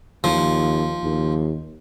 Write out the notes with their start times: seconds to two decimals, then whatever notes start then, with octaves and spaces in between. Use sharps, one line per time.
0.24 D#2 F3
1.03 D#2